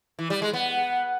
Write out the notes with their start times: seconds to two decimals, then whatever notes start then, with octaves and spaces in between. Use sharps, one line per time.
0.19 E3
0.30 G3
0.42 G#3
0.53 B3